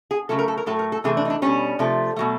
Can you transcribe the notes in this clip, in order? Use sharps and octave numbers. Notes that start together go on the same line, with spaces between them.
G#4
C#3 F#3 A3 A4
A#4
A4
A#4
A2 F#3 A3 A4
A#4
A4
C3 E3 A3 G#4
D4
D#4
D4
B2 G3 C#4
C3 F3 A3
B2 F#3 A3